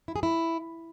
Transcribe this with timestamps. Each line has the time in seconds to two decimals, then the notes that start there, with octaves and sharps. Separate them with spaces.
0.08 E4
0.16 G#4
0.23 E4